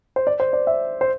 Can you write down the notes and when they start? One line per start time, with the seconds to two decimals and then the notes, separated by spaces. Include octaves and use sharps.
0.16 C5
0.27 D5
0.40 C5
0.53 D5
0.67 E5
1.01 C5